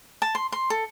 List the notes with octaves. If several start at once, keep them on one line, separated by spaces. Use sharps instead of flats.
A5
C6
C6
A4